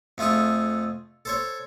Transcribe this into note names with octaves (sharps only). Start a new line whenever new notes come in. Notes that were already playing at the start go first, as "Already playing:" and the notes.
F2 A3 F4 G#4 C#6
A4 C5 C#5